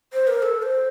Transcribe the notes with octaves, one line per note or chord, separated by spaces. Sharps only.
C5
A#4
A4
C5